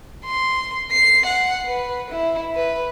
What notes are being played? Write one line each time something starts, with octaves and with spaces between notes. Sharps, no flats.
C6
C7
F#5
B4
E4
B4